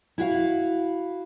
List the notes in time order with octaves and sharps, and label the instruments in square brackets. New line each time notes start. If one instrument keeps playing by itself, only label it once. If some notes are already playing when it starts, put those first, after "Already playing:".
[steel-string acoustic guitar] E4 F#4 F5